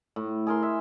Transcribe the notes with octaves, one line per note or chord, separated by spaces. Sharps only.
A2
G#4 A#4 C6
E5